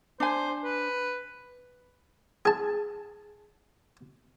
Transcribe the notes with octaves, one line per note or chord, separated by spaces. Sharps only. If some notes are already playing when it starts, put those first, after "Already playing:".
D4 C5 G#5
B4
G#4 A5